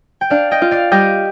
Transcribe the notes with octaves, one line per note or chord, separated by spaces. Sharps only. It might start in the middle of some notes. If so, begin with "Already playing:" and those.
G5
D4 D5 F5
D#5 G5
F4
D5 F5
G3 D#5 G5